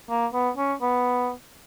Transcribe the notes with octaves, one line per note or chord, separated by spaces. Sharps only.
A#3
B3
C#4
B3